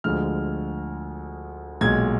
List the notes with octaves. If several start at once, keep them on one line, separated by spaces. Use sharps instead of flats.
D2 D3 F3 G#3 F6
B1 A#2 G#3 G#6